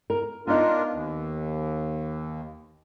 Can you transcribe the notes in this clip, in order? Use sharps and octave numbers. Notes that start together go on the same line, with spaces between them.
A#4
B3 D4 D#4 F4 A#4
D#2